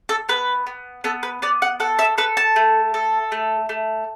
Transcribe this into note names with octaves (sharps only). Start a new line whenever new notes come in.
A4
B3 B4
B3
B3 A4
B4
B3 D5
F#5
A4 F#5
E5
A4 B4
A5
A3
A4
A3
A3